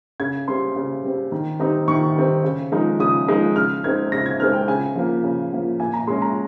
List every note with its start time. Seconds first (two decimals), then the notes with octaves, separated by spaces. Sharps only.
0.20 C#3 G#6
0.48 G3 C4 C6
0.76 C#3
1.04 G3 C4
1.32 D#3
1.59 G3 C4 D#4
1.88 D#3 C#6
2.16 G3 C4 D#4
2.44 C#3
2.72 F3 G#3 D#4
3.00 C#3 D#6
3.28 F3 G#3 D#4
3.56 C#3 F6
3.84 G#3 C4 D#4 G#6
4.12 C#3 A#6
4.26 G#6
4.40 G#3 C4 D#4 F6
4.53 G5
4.68 C#3 G#5
4.96 F3 A#3
5.24 C#3
5.52 F3 A#3
5.80 A#2 G#5
5.93 A#5
6.07 G#3 C#4 C6
6.22 A#5